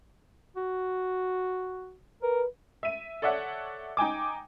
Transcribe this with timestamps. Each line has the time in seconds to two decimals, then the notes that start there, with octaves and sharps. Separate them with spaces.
0.56 F#4
2.23 A#4 B4
2.83 E5 D#7
3.22 A4 C#5 D5 E5 F#5
3.97 D#4 G5 G#5 D6